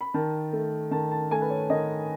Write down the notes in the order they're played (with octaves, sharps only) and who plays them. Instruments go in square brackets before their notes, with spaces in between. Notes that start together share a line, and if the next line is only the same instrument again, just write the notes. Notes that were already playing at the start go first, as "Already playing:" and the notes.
[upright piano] B5
D#3 A5
A3
D#3 A5
A5
A3 G#5
B4
C#5
D#3 D#5